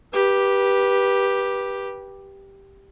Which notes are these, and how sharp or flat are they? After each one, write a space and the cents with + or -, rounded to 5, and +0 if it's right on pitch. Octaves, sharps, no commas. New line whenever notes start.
G4 +0 B4 -25